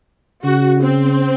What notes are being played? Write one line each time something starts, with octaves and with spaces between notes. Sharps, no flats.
C#3 F#4
C4